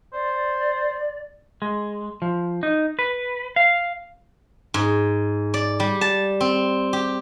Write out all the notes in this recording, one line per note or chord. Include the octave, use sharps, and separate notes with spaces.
C5 D5
G#3
F3
D#4
B4
F5
G#2
D5
G3
A5
C4
G4